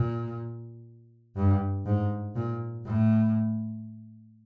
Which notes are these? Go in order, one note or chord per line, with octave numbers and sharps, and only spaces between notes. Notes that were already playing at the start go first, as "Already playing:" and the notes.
Already playing: A#2
G2
G#2
A#2
A2